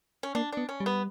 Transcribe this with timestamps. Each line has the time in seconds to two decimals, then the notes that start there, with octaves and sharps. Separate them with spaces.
0.23 C#4
0.35 A#3 D4
0.52 B3 D4
0.69 C#4
0.80 G3
0.86 B3